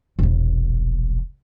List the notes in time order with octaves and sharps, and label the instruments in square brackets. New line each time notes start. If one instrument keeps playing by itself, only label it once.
[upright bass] E1 A#1